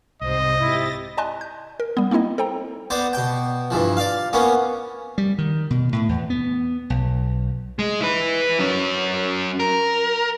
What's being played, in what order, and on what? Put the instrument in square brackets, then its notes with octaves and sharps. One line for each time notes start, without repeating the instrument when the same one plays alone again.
[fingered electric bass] C2 G#2 [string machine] C3 C5 [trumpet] D#5
[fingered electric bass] G#2 [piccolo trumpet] E4 [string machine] G4 A6 A#6
[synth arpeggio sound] D5 D#5 G#5 A5 C6 F#6
G6
A#4
G3 B3
A#3 C4 D#4 E4 D#5
A4 C5 G5 A#5
[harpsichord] B3 C5 D5
B2 G5
G2 E3 F3
D5 F5
A#3 B3 C#4
[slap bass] G3
D#3
B2
A2
E2
B3
B1
[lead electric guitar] G#3
E4 B4
F#3 C#4
A#4